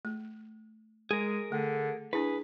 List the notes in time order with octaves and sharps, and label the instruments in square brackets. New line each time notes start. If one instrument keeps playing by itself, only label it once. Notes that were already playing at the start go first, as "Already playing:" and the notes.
[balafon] A3
[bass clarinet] G#3 [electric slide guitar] G#4 A#4
[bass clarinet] D3 [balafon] A3
[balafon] D4 E4 [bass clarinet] G#4 [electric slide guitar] B4